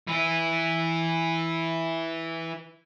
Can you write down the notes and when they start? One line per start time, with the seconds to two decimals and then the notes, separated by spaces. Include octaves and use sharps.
0.08 E3 E4